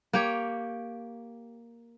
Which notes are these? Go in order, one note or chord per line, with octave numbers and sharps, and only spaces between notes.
A#3 G4 C#5